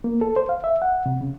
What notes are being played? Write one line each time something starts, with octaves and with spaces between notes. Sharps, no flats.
A#3
A4
C5
F5
E5
F#5
C3
C#3